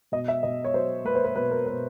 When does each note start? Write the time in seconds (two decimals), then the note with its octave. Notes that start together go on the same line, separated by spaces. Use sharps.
0.12 B2 D#5
0.28 E5
0.43 B2 D#5
0.64 C#5
0.74 F#3 C5
1.04 A#3 B4
1.15 C5
1.24 B4
1.36 B2 B4
1.51 A#4
1.66 B2 B4